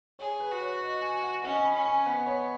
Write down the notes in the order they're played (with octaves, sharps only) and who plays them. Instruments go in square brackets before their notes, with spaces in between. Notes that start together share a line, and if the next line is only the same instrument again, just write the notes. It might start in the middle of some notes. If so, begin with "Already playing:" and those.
[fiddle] G#4 [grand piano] C#5
[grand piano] B4
[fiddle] F#4
[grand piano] C#5
D#5
G#5
F#5
[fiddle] C#4 [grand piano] D#5
[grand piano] G#5
B5
[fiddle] C#4
[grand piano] G#5
[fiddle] B3 [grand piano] F#5
[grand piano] C#5